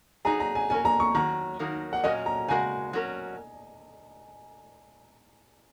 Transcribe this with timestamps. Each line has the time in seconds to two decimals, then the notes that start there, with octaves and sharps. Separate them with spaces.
0.25 F#3 D#4 G#4 A#5
0.40 A#5
0.55 G#5
0.70 F#3 C#4 A#4 G#5
0.85 A#5
1.00 C#6
1.15 D#3 F#3 C#4 A#5
1.59 D#3 F#3 A#3 D#4 A#4
1.93 F#5
2.03 A#2 F#3 C#4 F#4 A#4 D#5
2.26 A#5
2.48 C#3 G#3 F#4 A#4 G#5
2.93 F#3 C#4 A#4